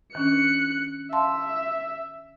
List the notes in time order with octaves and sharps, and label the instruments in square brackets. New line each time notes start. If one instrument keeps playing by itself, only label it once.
[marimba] D#3 C#4 D4 [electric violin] F#6 C#7
[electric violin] E5 [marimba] F5 A5 C6